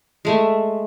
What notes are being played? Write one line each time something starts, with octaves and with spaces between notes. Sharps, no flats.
G#3 A3 E5